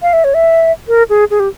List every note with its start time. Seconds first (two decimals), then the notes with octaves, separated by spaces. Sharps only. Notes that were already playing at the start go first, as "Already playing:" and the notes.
0.02 F5
0.13 E5
0.24 C#5
0.34 E5
0.88 A#4
1.10 G#4
1.31 G#4
1.40 G4